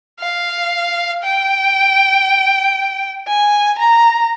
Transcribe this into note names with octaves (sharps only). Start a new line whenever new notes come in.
F5
G5
G#5
A#5